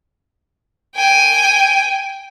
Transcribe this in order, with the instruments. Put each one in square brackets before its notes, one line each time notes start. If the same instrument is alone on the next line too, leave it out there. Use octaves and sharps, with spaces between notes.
[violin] G5 G#5